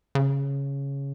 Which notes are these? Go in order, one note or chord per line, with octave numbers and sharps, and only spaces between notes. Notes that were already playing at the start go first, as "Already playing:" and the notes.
C#3